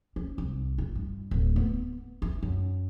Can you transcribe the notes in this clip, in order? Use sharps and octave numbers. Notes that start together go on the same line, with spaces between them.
C#4
C2
F4
G2
D1
B3
E3
F#2